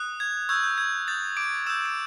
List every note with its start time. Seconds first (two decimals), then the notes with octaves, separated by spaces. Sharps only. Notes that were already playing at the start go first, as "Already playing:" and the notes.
Already playing: D#6 F#6
0.20 G#6
0.49 C#6 E6 G6 G#6
0.63 G6
0.78 G#6
1.07 D#6 G6 A6
1.37 D6 D7
1.66 D#6 E6 G6 E7
1.86 D7